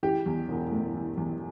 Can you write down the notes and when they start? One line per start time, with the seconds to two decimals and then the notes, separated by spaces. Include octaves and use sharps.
0.03 E3 G4
0.26 E2
0.49 E1
0.71 A3
0.95 E3
1.17 E2